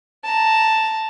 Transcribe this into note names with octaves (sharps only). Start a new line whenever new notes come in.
A5 A#5